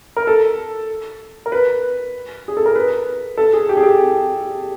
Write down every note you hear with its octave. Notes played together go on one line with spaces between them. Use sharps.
A#4
A4
A#4
B4
G#4
A4
A#4
B4
A4
G#4
G4
G#4
G4